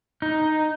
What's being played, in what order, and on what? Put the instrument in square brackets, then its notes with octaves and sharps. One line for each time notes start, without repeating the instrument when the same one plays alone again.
[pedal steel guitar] D#4